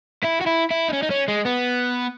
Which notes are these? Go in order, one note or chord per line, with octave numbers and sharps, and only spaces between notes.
E4
F#4
E4
E4
D#4
C#4
D#4
C#4
G#3
B3